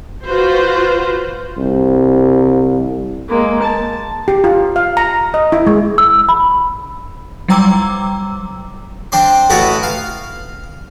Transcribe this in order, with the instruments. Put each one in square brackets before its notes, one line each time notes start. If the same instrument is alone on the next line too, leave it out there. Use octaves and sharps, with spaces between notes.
[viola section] F4 F#4 B4 C5
[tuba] C2
[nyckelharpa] G#3 A#3
A5
[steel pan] G4
F4
F5
A#5
D#5
E4
G#3
[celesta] E6
B5
[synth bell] F#3 G3 G5 A#5 D6 E6
[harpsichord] C4 D4 C6
A1 B3 E4 F#4 A5 A#5
F5